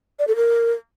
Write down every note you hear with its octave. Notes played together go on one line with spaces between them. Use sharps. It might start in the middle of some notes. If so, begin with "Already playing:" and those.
D5
A4
A#4